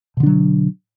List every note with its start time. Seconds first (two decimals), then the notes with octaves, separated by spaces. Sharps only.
0.17 B2
0.20 D3
0.23 D4
0.26 F#3